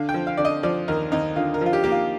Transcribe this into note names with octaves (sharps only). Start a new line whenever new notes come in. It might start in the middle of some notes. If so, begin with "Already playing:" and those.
Already playing: D3 F5
G5
F3
F5
D3 D5
D#5
F3 D5
D#2 A#4
D#2 D#4
D3 F4
A#4
F3 F4
G4
A#3 G4
F4